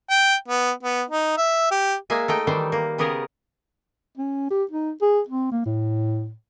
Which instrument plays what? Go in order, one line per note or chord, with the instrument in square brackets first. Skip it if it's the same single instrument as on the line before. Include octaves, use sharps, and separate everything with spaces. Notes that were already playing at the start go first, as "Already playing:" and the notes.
[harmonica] G5
B3
B3
D#4
E5
G4
[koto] G#3 A#3 E5 G#5
A3 D#4 G5
D#3 E3 G3 C5
A#3
C#3 B3 G4 G#4 A#4
[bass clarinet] C#4
G4
D#4
G#4
C4
A#3
A2